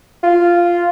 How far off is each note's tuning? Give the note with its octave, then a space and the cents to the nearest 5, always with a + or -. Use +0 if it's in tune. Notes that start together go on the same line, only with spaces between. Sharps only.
F4 -5